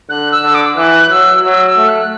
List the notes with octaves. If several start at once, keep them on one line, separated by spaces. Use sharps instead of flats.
D3 F#6
E6
D3
D6
E3 F#6
F#3 E6
F#3 E6
E6
A3
F#6